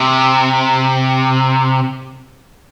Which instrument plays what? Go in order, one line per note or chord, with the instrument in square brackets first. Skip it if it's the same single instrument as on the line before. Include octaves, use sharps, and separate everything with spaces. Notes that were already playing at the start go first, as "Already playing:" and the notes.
Already playing: [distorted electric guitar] C3